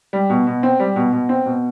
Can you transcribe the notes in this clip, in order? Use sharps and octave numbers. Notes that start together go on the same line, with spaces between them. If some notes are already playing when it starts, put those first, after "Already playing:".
G3
B2
B2
C4
G3
B2
B2
C4
B2